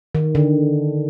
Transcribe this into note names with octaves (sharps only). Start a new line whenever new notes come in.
D#3
D3